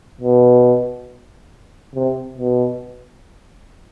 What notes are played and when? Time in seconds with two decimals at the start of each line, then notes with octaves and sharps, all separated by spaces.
0.21 B2
1.95 C3
2.38 B2